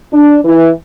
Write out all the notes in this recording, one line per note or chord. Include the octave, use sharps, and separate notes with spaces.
D4
E3